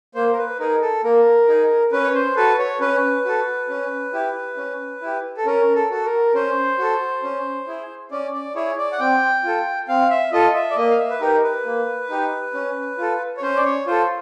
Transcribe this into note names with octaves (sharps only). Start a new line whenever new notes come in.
A#3 C5
A#4
B4
D#4 G#4 A#4
A4
A#3 A#4
D#4 G#4
C#4 B4
C#5
C5
F#4 A4 B4
C#5
C#4 B4
F#4 A4
C#4
E4 G4
C#4
E4 G4
A4
C#4 A#4
A4
F#4 A4
A#4
C#4 C5
F#4 A4
C#4
E4 G#4
C#4 D5
D5
E4 G#4 C#5
D5
F#5
C4 G5
F4 A4
C4 F5
E5
F4 A4 D#5
E5
D5
A#3 D#5
F5
E5
B4
D#4 G4 A#4
B4
A#3
D#4 G4
C#4
F4 A4
C#5
C#4 C5
D5
C#5
F4 A4 C5